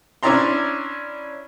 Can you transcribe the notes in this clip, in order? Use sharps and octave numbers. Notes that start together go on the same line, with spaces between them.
C#4 D4 E4 D5 A#5 C6